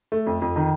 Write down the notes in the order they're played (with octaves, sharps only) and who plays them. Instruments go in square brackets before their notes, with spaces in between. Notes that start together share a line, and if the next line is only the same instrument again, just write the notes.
[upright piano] A3
F2
F2
D#3